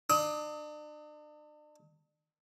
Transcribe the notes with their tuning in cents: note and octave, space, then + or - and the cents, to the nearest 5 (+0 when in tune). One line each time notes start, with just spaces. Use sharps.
D4 +40 D#6 +35